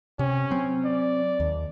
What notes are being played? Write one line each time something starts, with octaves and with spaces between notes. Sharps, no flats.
C3 C#4
F#3 C4
D5
D#2